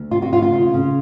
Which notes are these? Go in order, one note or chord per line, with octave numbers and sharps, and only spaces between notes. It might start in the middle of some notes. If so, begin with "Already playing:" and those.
Already playing: D2
C3 F4
F#4
D2 F4
F4
C#3
C#3